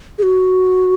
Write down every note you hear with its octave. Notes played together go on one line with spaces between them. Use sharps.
G#4
F#4